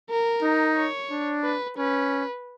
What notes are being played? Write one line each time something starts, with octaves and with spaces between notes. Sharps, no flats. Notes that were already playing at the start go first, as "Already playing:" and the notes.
A#4
D#4
C#5
D4
B4
C#4 B4